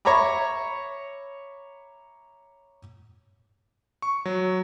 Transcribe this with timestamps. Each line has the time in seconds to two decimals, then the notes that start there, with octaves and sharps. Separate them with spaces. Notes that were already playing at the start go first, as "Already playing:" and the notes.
0.05 C#5 E5 A#5 B5 D6
4.02 C#6
4.25 F#3